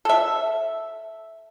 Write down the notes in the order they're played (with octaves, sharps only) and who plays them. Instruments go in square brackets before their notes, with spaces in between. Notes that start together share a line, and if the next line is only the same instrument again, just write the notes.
[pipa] A4 E5